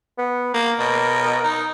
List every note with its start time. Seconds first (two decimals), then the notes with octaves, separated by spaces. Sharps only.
0.18 B3
0.54 A#3 A#4
0.79 B2
1.44 D#4